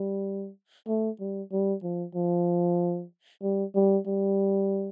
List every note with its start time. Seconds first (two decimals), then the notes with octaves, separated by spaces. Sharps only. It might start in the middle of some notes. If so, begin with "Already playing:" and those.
Already playing: G3
0.87 A3
1.20 G3
1.52 G3
1.83 F3
2.15 F3
3.42 G3
3.75 G3
4.07 G3